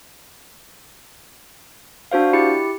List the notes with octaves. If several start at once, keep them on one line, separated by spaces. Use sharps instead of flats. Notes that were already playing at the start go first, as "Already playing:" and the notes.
D4 F#4 C5 F5
E4 G4 C#7